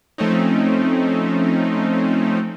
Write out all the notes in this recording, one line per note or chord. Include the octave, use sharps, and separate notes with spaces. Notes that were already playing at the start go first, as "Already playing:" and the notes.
F3 A3 C4 C#4 D#4